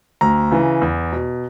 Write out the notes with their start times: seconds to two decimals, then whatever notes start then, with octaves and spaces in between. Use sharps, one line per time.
0.21 D2 A#5
0.51 C#3 E3
0.82 E2
1.13 B2